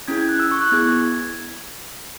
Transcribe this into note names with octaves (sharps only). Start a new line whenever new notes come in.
C#4 E4 G#4 G#6
G#6
F#6
E6
C#6
F#6
B3 E4 G#4 G#6
G#6